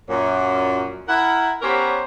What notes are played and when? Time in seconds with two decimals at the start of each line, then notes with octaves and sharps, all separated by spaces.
0.09 F#2 A#2
1.08 E4 A#4 F#5
1.62 B3 C#4 G4 A#4 C5 C#5